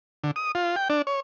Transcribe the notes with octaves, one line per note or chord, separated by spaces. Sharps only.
D3
D#6
F4
G5
D4
C#5